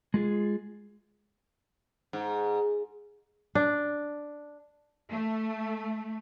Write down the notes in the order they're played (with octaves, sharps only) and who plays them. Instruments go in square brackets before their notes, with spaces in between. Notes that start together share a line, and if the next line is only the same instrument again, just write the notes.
[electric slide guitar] G#3 F4 G#4
[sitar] G#2
[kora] D4
[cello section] A3